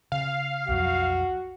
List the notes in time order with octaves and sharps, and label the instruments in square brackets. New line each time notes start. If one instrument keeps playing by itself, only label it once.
[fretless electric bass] C#3 [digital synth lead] F5
[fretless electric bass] B1 F2 F#3 [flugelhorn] F#4